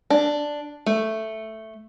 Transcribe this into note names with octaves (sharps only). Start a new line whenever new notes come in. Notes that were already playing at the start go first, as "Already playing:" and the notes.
D4
A3